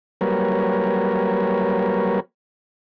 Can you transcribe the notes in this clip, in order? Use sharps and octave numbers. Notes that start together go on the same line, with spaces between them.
F#3 G3 A#3 A#4 B4 C#5